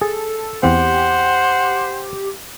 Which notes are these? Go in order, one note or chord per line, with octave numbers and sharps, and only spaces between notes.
G#4 A4
E2 C4 G4 C5 F#5